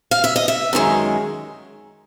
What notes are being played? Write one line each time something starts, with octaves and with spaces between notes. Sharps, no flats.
F5
E5
D#5
E5
F#2 D#3 G#3